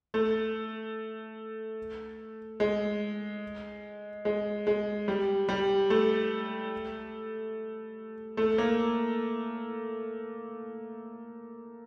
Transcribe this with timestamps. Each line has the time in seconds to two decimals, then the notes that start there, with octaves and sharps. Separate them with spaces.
0.14 A3
2.60 G#3
4.25 G#3
4.67 G#3
5.08 G3
5.49 G3
5.90 A3
8.37 A3
8.58 A#3